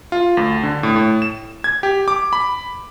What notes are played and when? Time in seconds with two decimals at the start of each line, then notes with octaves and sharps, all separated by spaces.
0.12 F4
0.37 D2
0.63 D3
0.83 A2
0.96 A2
1.22 E7
1.64 G#6
1.83 G4
2.08 D6
2.33 B5